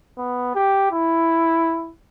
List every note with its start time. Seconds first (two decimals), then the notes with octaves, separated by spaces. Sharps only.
0.18 B3
0.55 G4
0.92 E4